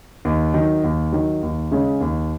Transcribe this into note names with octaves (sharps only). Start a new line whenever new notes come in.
D#2
D#3 F#3
D#2
D#3 F#3
D#2
C#3 G#3 C#4
D#2